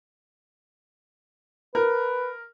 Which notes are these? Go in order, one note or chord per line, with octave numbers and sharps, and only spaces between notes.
A#4 B4